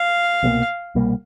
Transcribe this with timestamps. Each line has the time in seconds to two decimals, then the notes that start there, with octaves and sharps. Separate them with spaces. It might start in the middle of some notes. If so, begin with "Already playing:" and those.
Already playing: F5
0.43 C2 B2 G3 A#3
0.95 C2 B2 G3 A#3